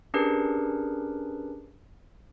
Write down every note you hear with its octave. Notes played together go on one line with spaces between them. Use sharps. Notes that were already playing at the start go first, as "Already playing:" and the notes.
C#4 D4 G4 G#4 A#4 B4